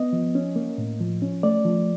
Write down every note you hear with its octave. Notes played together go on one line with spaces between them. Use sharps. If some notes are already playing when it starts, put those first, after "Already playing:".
Already playing: B3 D#5
F3
C#4
A#3
A2
F3
C#4
A3 D5
F3